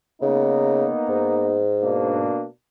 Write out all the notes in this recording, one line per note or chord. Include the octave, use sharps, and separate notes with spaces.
C#3 A#3 B3 D#4
G#2
B2 A#3 D4